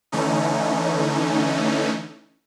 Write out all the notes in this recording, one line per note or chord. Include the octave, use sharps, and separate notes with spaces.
D3 E3 A3 C#4 D#4